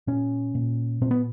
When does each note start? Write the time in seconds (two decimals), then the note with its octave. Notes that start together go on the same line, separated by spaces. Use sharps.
0.07 A#2 C#4
0.55 A#2
1.02 A#2 C4
1.11 B3